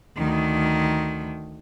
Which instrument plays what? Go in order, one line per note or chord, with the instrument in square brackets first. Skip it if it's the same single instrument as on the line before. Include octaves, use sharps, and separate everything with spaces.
[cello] D2 D#3